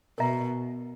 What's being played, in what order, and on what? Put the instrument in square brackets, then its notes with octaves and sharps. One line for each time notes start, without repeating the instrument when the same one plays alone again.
[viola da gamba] B2 [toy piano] A#4 E5 A#5